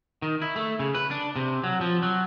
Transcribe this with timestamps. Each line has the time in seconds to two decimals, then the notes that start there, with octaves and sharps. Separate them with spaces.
0.22 D#3
0.42 E4
0.56 A3
0.79 C#3
0.95 B4
1.11 D4
1.36 C3
1.64 F#3
1.81 F3
2.02 F#3